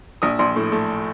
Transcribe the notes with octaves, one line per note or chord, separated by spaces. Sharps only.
A#1 D#6
A#1 C6
A2
A3